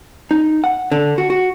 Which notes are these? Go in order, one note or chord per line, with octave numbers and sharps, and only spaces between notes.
D#4
F#5
D3
F#4
F#4